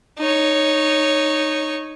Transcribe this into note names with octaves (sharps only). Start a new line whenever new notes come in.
D#4 C#5